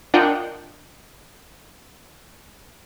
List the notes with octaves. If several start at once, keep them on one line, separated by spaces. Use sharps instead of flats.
D4 F4 A#4 D#5 F#5 G5